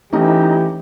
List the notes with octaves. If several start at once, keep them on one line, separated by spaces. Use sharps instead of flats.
E3 A3 C#4 D#4 G4 D#5